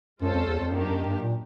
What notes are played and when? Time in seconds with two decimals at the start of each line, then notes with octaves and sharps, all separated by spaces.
0.22 F#2 G#3 C#4 F4 A4 C5
0.34 F2
0.47 E2
0.60 F2
0.72 F#2 D#3 F#3 A#3 D4 G4
0.89 F#2
1.05 G2
1.23 A#2